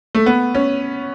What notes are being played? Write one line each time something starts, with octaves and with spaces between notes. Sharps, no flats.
A3
B3
C#4